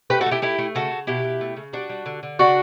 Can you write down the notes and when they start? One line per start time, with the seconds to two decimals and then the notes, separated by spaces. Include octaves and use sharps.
0.10 A3 G4 B4
0.21 F#4 A4
0.26 A3
0.31 E4 G4
0.42 A3 E4 G4
0.58 A3
0.75 C#3 F#4 A4
0.91 C#3
1.07 B2 E4 G4
1.24 B2
1.41 A3
1.56 C#3
1.73 G3 D4 F#4
1.90 G3
2.06 D3
2.23 D3
2.39 C#3 D4 F#4